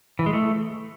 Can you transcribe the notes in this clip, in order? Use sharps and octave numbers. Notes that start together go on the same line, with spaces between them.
E3
G#3
A3